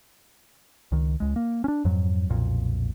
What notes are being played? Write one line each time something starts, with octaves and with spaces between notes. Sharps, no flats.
C#2 D#3
C#2 G#3
A#3
C#4 D4
F2 G#2 F#3
B1 F2 A#2